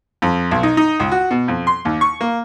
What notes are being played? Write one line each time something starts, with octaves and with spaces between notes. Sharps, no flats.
F2
B1
D#4
D#4
C#2
F#4
B2
F2
C6
D#2
C#6
A#3